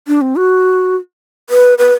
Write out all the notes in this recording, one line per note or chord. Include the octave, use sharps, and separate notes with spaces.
D4
C4
F#4
B4
B4